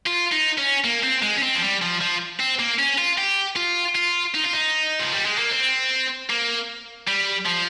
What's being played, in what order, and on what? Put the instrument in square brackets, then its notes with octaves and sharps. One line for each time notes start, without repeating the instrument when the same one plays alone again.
[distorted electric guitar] F4
D#4
C#4
A#3
C4
G#3
C#4
C4
F3
G3
F3
F3
C4
A#3
C#4
F4
G4
F4
F4
D#4
F4
D#4
F3
G3
G#3
A#3
C4
A#3
G3
F3